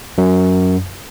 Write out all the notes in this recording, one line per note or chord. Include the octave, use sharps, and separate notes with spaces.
F#2